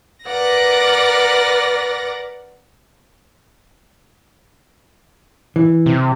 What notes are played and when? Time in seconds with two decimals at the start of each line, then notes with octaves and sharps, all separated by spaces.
0.26 A#4 B4 D5 F#5 A#6
5.56 E3
5.86 C3